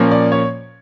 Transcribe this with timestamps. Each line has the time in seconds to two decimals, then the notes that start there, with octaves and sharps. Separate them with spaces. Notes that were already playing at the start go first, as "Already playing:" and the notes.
Already playing: A#2 F3 A#3 C#4
0.11 D5
0.32 C#5